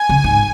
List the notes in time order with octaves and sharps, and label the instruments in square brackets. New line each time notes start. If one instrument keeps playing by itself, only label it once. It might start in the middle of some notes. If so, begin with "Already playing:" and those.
Already playing: [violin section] G#5
[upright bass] C#3
G#2